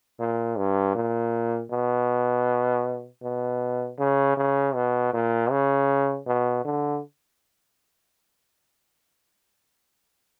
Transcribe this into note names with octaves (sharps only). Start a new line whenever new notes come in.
A#2
G2
A#2
B2
B2
C#3
C#3
B2
A#2
C#3
B2
D3